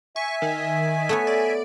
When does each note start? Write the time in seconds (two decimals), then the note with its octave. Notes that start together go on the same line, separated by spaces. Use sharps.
0.16 E5 G#5 C#6
0.42 D#3
1.09 A3 B3 C#5
1.27 D5